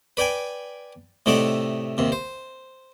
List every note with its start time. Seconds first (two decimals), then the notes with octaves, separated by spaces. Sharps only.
0.17 B4 D5 G5 G#5
1.26 A2 C3 A3 D#4 D5 F#5
1.98 D#2 C3
2.12 C5